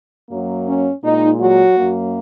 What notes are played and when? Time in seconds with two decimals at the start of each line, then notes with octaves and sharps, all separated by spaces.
0.29 F#2 F#3 A#3
0.67 C#4
1.04 A#2 G#3 D#4
1.41 F#3 F#4
1.77 F#2 F#3 A#3